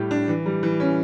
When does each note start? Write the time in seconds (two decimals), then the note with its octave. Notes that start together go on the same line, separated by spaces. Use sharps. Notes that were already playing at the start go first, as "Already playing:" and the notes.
Already playing: A2 G3 G4
0.11 D4
0.28 E3
0.46 G3
0.63 E3
0.80 C#4